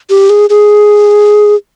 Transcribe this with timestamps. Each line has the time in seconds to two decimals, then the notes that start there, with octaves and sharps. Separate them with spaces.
0.10 G4
0.29 G#4
0.50 G#4